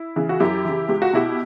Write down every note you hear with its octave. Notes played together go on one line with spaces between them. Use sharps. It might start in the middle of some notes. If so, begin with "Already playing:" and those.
Already playing: E4
C#3 E3
F#4
F#2 E4 G4
C#3 E3
C#2 G4
F#4
B2 E4 G4